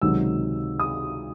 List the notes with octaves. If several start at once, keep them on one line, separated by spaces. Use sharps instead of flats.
C#2 C3 D#3 F#3 E6
D#6